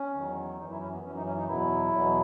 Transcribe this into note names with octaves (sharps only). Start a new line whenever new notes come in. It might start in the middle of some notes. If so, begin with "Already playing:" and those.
Already playing: C#4
E2 D#3 F#3
F#2 E3 D#4
E4
C#4
B3
F#2 E3 C#4
D#4
C#4
D#4
E2 B2 F#3 E4
E2 B2 F#3